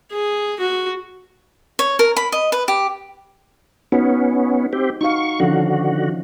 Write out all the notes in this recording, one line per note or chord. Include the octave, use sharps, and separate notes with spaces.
G#4
F#4
C#5
A#4
B5
D#5
B4
G4
B3 C#4 D#4 F#4
C4 G4
D#4 F#4 F5 C#6
D3 D#3 F3 C#4 F#4